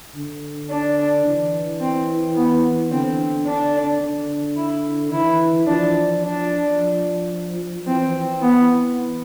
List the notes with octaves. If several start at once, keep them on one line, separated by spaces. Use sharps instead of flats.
D3
D4
E3
C4
B3
D3 C4
D4
D3
E4
E3 E4
F3 D4
D4
F3
E3 C4
B3